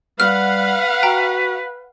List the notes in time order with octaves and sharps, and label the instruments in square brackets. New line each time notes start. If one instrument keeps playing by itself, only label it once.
[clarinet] G3 [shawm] B4 [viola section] F5 F#5 [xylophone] F6
[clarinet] F#4 [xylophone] G5 A#5